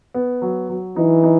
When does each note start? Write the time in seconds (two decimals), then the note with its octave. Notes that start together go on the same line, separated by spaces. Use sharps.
0.14 B3
0.42 F#3
0.69 F#3
0.96 E3 D#4
1.24 D#4